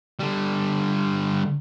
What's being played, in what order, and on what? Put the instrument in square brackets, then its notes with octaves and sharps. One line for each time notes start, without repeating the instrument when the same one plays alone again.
[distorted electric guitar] D3 G3